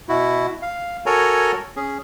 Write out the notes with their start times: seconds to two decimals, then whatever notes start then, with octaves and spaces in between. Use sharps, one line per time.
0.09 B2 E4 F#4
0.62 F5
1.06 F#4 A4 A#4 C#5 G#5 A#5
1.76 C#4 G#4